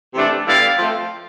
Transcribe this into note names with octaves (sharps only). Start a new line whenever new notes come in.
C3 E3 A3 D4
D3 G3 B3 E4 D5 F5
F3 A3 C4